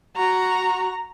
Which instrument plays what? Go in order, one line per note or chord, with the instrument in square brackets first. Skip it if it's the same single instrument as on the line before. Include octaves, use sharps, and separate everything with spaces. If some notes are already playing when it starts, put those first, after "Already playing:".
[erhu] F#4 [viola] A#5